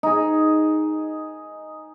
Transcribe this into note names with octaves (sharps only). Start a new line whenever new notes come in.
D#4 G#4